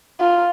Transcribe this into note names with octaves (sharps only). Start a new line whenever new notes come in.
F4